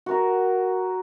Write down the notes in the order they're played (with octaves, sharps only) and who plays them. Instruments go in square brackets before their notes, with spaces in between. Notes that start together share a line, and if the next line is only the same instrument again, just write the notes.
[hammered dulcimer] F#4 A#4 A#5